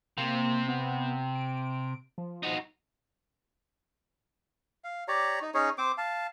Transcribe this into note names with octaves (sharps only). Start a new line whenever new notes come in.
C3 A#3
B3
D7
F3
D#4 F#4
F5
G4 C#5 D5 A#5
D#4
C#4 D#4 G#4 C#5
C4 C5 D6
F5 A5